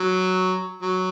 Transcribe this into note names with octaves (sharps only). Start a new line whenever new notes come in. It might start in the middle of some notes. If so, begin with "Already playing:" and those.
Already playing: F#3
F#3